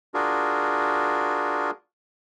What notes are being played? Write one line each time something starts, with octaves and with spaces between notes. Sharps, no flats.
D4 F4 F#4 G#4 A#4